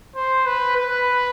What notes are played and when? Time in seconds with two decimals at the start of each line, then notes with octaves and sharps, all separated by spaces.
0.15 C5
0.46 B4
0.76 B4